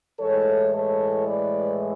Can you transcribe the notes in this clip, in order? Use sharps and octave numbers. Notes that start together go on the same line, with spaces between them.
A2 E3 G#3 A4 C#5
A4 C#5
B4 D5